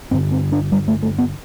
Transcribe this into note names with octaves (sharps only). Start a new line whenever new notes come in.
G2 D3 C4
C4
D4
G3
A3
A3
B3